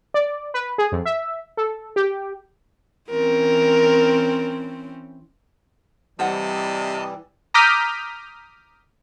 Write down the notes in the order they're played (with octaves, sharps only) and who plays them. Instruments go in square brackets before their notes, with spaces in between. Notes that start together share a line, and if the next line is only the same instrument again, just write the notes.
[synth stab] D5
B4
G#4
F2
E5
A4
G4
[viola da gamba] E3 C4 C#4 [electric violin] A#4
[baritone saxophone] C3 [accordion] E3 G3 [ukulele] C5 F#5 [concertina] D#5 A5 D#6
[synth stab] A#5 D6 D#6 F6 G6 B6